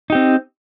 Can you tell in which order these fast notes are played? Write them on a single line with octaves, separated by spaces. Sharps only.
D#4 G4 C4